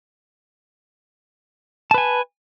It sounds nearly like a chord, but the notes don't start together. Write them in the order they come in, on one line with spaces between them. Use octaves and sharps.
A5 B4 G#5